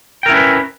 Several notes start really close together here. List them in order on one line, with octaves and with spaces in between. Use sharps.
G5 A#4 E4 C#4 B4